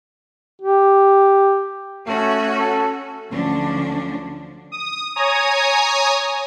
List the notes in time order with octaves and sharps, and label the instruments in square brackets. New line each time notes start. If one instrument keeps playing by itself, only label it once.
[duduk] G4
[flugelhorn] A3 [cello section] C#4 F#4
[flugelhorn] A4
[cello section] D2 D3 F3 F#3 C#4 D4
[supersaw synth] D#6
C#5 G#5 A#5 D#6